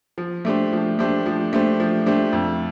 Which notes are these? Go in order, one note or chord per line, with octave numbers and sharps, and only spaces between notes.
F3
A3 D4 G4 C5
F3
A3 D4 G4 C5
F3
A3 D4 G4 C5
F3
A3 D4 G4 C5
F2